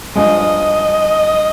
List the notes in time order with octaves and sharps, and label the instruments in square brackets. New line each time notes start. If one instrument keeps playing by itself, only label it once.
[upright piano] G2 F3 G#3 [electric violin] D#5
[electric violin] D#5